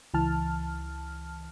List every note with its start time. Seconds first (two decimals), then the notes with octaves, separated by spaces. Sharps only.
0.14 C#2 E3 A5 F6